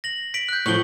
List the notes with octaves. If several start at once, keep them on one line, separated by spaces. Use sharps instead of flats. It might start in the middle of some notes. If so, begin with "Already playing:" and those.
A#6 F#7
B6 D7 F#7
F#6 G6
A2 F3 C#6 F#7 G7